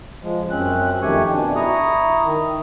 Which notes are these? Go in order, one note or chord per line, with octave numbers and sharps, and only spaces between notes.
F3 G#3
F#2 C4 C#4 F#6
F2 D#3 A3 G4 G#5 C#6
B2 D4
E4 A#5 C#6 D#6
D#3